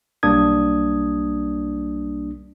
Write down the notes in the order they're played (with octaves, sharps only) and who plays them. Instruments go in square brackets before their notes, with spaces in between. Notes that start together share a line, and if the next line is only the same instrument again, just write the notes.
[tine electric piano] B1 G3 A#3 D4 D#6 G#6